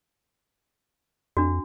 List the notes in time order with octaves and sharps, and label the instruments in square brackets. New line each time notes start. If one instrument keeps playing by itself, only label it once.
[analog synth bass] F2 [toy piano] D4 F#4